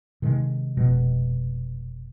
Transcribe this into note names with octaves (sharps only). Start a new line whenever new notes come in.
C3 D#3 G#3
F1 B2 G#3